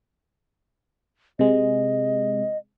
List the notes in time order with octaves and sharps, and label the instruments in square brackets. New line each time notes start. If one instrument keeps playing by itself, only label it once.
[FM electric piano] C3 G#3 [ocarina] D#5